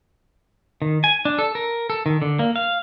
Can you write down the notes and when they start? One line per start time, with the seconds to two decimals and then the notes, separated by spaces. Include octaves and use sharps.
0.82 D#3
1.04 G#5
1.25 D4
1.39 A4
1.55 A#4
1.90 A4
2.06 D#3
2.22 D3
2.39 A#3
2.56 F5